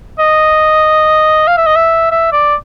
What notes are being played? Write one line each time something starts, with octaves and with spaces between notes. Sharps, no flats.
D#5
F5
E5
D#5
E5
E5
D5